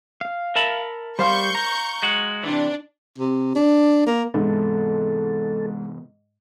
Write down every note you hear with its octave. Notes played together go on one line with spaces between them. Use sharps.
F5
A#4 E5 A5 B5
G3 C5 F5 C6 C#6 G6
A#5
G#3 F#4
C3 E3 D4
C3
D4
A#3
G#2 C3 E3 B3 A4